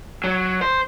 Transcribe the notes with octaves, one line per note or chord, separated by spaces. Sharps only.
F#3
C5